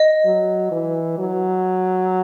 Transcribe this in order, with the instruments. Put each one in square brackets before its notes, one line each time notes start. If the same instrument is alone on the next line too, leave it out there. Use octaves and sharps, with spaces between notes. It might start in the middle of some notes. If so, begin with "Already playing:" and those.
Already playing: [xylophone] D#5
[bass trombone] F#3
E3
F#3